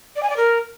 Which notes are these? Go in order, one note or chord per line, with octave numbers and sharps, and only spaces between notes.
D5
G#5
D5
A#4